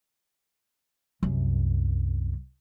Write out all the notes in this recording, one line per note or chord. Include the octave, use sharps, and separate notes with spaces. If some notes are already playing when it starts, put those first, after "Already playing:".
C2 F#2